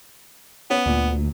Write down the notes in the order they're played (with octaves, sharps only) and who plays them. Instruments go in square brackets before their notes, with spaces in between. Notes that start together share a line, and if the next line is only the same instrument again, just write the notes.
[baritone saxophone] B3 [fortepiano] C#4
[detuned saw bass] D2 [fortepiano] A#2